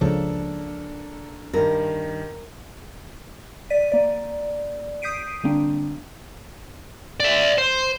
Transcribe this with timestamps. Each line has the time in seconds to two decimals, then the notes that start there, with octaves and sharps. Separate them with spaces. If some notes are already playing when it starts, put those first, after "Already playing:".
0.01 C#2 C#3 F3 A#3 D4 A4
1.53 G2 D#3 A#4
3.70 D5 B6 D#7
3.92 A#3 D5
5.02 D#6 G6 B6 C7 D7 D#7
5.44 D3 G3 A#3 C4 D4
7.20 D5 E5
7.58 C5